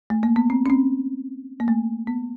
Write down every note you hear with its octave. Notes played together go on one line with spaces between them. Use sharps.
A3
A#3
B3
C4
C#4
C4
A#3
A3
B3